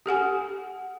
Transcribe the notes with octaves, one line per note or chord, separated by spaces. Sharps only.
G4 A4 F#5 G#5